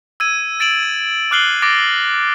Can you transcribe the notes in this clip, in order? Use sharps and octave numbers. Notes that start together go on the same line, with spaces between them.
E6 G#6 D#7
A6 D7 E7 F#7
D#7
D6 F6 F#6 C7 F#7 G7
D6 A6 A#6 D7